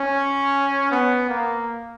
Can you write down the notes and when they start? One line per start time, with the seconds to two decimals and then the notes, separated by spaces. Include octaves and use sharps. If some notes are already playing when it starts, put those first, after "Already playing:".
Already playing: C#4
0.91 B3
1.29 A#3